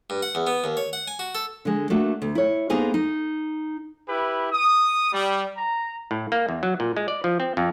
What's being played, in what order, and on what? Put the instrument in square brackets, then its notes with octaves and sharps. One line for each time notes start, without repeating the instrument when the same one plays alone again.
[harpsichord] G2
F#5
E2
B3
D#2
C#5
F#5
G#5
F#4
A4
[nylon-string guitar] D3 G#3
A3 A#3 D4 F#4
D2
E4 C#5
A#3 B3 D#4 G#4 A4 C5
D#4
[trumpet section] E4 G4 B4
D#6
G3
A#5
[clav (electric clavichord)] A2
A#3
E2
F#3
A#2
G#3
D5
F3
C4
F2